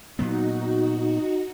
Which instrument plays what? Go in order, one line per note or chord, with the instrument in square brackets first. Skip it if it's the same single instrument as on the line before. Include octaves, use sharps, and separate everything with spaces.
[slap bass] A#2 F#3 B3 [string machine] D#4 F#4